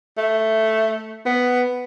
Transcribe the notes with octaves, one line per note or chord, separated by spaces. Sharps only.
A3
B3